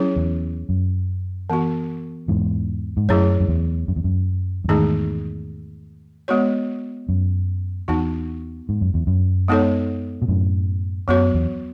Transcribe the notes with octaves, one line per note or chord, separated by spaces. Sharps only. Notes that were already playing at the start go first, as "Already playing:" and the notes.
Already playing: F#3 C#4 E4 G#4 C#5
E2
F#2
E3 B3 F#4
E2 G#2
G#2
F#2 F#3 A3 E4 G#4 C#5
F#2
E2
F#2
E2
F#2
F#2
E2 G#2 D#3 A3 D#4 G#4
G#3 B3 F#4 C#5
F#2
E2 B3 D#4 F#4
G#2
F#2
E2
F#2
G#3 B3 D#4 A4 C#5
B2
F#2 A2
F#2 F#3 B3 F#4 C#5
E2